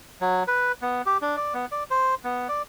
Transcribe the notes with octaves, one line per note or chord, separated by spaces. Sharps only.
F#3
B4
B3
G4
D4
D5
B3
D5
C5
B3
D5